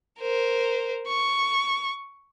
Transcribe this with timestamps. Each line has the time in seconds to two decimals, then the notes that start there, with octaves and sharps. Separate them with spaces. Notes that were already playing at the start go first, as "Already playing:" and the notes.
0.20 A#4 C5
1.08 C#6